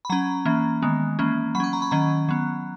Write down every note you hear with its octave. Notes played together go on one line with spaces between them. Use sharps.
B5
F#3 C#4 A#5
E3 A#3 C#4
D#3 G#3 B3
E3 A#3 C#4
F#3 B5
C#4 C#6
A#5
B5
D#3 F#3 C#4 A#5
F#3 B3